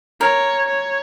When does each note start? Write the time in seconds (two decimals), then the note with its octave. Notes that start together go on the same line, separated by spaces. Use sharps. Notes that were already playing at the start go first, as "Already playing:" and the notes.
0.21 A#4 C#5
0.68 C#5